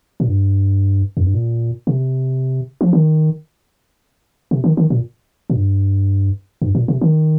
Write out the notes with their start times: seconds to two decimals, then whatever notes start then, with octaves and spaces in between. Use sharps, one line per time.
0.20 A#2
0.28 G2
1.17 F2
1.26 G2
1.34 A#2
1.87 C3
2.81 F3
2.93 D#3
4.51 C3
4.64 D#3
4.77 D#3
4.90 A#2
5.50 A#2
5.56 G2
6.62 G2
6.75 A#2
6.88 C3
7.01 D#3